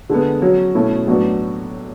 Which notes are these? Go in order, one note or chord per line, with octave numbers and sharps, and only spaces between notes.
D3 G#3 B3
F#3 C#4 F#4
B2 A3 C#4 E4
A2 F#3 B3 D4 F#4